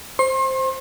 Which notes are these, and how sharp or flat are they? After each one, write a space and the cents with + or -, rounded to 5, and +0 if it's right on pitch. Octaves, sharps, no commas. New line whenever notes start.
C5 +0 C6 +40